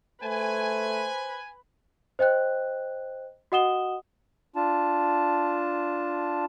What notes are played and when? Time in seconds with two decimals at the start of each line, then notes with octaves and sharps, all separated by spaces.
0.23 A3 B4 C5 G#5
2.19 C5 D#5 G5 F#6
3.52 F#4 D#5 F#5 D#6 E7 G7
4.56 D4 F4 A5